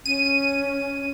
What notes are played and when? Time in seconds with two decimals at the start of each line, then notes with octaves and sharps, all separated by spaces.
0.06 C#4 D#7